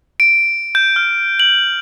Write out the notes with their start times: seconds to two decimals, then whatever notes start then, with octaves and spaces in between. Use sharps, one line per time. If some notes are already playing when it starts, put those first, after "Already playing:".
0.20 D7
0.75 G6
0.96 F6
1.40 F#7